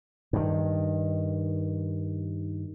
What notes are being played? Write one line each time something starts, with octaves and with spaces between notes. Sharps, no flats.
G2 D#3